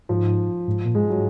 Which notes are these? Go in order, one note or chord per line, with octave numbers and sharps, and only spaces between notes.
G#2 F3
G#2
A#2
G#2 G#3
F#3